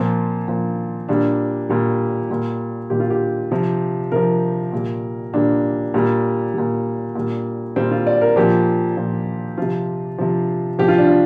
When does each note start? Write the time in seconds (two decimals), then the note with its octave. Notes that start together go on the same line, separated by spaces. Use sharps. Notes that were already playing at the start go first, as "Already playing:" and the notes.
Already playing: A#2 F3 C4
0.48 A#2 F3
1.09 A#2 G3 D4
1.69 A#2 G3
2.30 A#2 G3
2.90 A#2 G3 G4
3.00 F4
3.10 G4
3.51 C3 F3
4.12 C3 F3 A#4
4.72 A#2 G3
5.33 A#2 G3 D4
5.94 A#2 G3
6.54 A#2 G3
7.15 A#2 G3
7.76 A#2 G3 C4
7.91 F4
8.07 D5
8.21 A#4
8.36 A#2 F3 G4
8.97 A#2 F3
9.58 C3 F3 F4
10.18 C3 F3
10.79 C3 F3 G4
10.88 F4
10.98 D4
11.07 F4